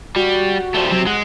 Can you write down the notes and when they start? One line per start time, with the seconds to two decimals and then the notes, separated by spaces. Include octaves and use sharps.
0.16 G3 F#4
0.74 F3 G3 A3
0.91 C3 F#3 C4
1.07 G#3 F#5